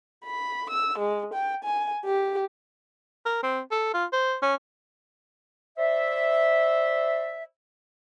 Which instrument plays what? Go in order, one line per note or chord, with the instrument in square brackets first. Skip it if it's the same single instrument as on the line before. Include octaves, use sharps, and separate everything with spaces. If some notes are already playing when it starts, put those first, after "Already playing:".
[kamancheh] B5
E6
G#3
G5
G#5
G4
[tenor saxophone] A#4
C4
A4
F4
C5
C#4
[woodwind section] C5 D5 E5